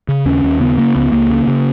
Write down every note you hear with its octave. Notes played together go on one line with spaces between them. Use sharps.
C#3
D#2 C#4
D#2
C#3 B3
C#3 A#3
C#2 B3
C#2 A#3
C#3
C#3